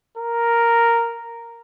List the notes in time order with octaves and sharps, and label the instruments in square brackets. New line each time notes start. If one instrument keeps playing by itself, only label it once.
[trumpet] A#4